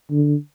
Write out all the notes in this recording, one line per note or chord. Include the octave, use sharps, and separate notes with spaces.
D3